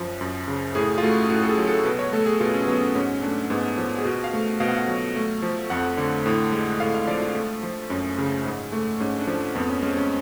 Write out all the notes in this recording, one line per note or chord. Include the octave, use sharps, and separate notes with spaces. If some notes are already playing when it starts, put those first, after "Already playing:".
Already playing: F#2 F3
F#2
C#3
A2 G#4
F4
A3 F#4
A2 F#4
A4
G#4
F#3
A4
B2 B4
C#5
A3 A4
G#4
B2 F4
C#4
F#3 B3
C#4
G#2 C#4
A3 D4
G#2 B3
F3
G#4
B2 F#4
F5
A3
B2 F5
F#5
F5
F#3
A3
F3
F2 F#5
D3
A2
G#3
A2 F5
F5
F3 D5
F4
A3
F3
F#2 C#4
C#3
G#2
A3
G#2 C#4
D4
F3
F2 B3
C#4
G#3 C#4
C#4